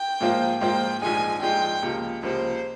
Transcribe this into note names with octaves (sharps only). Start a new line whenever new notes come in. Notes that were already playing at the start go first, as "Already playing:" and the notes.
Already playing: G5
G#2 F3 A#3 F4 C5
G#2 F3 A#3 F4 C5 G5
A#1 G#2 F3 G#3 D#4 G#5
A#1 G#2 F3 G#3 D#4 G5
C#2 C3 F3 A#3
C#2 C3 F3 A#3 C5